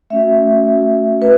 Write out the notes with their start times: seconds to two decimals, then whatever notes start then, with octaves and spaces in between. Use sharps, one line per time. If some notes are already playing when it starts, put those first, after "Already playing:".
0.10 A3 C#4 F#4 E5
0.66 A3 C#4 F#4
1.21 A3 C#4 F#4 B4